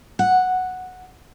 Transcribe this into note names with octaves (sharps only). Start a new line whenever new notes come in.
F#5